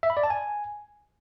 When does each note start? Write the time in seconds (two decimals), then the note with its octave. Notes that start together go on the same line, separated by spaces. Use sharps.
0.03 E5
0.10 B5
0.17 D5
0.24 A5
0.30 G#5